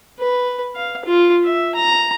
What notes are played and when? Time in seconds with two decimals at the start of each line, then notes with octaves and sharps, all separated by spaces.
0.19 B4
0.75 F5
1.05 F4
1.45 E5
1.75 A#5